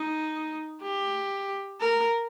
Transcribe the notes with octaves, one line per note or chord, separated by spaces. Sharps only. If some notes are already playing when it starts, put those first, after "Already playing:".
Already playing: D#4
G4
A#4